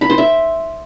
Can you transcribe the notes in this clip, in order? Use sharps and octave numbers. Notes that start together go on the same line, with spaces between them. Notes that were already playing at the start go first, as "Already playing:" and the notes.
B5
C5
E5